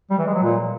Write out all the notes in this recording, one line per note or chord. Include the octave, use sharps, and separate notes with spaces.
G3
E3
G#3
F#3
A#2